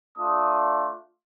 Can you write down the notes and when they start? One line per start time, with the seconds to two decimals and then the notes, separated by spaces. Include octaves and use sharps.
0.16 A3 D4 F4 D#6